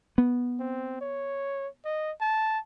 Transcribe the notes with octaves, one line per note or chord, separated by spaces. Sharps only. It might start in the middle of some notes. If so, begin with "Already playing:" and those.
B3
C4
C#5
D#5
A5